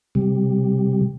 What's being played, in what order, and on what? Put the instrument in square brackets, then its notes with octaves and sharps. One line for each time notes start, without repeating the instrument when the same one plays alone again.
[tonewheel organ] C3 G3